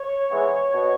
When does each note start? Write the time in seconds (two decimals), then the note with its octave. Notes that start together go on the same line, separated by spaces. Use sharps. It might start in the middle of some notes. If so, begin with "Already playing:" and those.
Already playing: C#5
0.31 E3 G#3 B3
0.74 B2